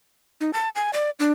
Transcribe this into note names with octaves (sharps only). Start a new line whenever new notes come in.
D#4
A5
G#5
D5
D4